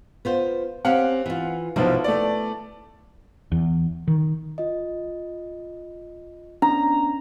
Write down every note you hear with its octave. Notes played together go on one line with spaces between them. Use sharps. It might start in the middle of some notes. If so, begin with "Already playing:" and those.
B3 F4 C5
C4 C#4 G4 F5 F#5
E3 F4
F1 B1 F3 B3 E4 F#4
A3 D5
E2
D#3
F4 D#5
B3 C#4 D4 A#5